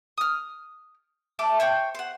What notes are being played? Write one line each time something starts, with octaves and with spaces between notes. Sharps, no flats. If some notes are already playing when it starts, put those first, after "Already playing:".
D#6 F6
A3 A4 D6
C5 C#5 G5
C5 F#5